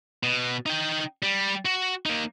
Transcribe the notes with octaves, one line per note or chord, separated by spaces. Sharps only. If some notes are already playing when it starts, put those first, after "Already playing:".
B2
D#4 G5
G3
F#4
A#3 D#4